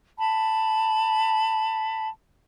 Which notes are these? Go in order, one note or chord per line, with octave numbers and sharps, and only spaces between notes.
A5 B5